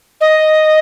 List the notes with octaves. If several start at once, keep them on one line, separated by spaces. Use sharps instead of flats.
D#5